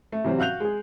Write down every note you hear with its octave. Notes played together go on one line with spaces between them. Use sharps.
A3
C3 E3 F#3 G3 C4
F#4 F5 F#6 G6 F7
G#3 G#4